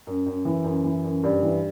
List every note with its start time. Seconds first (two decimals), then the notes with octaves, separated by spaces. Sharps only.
0.07 F#2
0.26 F#2
0.45 E3
0.64 F#2
0.84 E3
1.04 F#2
1.23 G2
1.42 E3